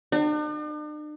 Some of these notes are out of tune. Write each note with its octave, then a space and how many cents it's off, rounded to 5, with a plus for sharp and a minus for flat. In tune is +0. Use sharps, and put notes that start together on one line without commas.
D4 +45